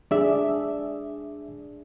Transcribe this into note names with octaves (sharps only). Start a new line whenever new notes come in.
D4 G#4 D5 E5